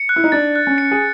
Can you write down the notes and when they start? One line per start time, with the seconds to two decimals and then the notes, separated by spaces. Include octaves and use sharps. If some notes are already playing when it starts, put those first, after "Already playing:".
Already playing: C#7
0.09 F#6
0.16 E4
0.24 D#4
0.32 D4 A6
0.56 F#6
0.67 C#4
0.78 C#7
0.91 G#4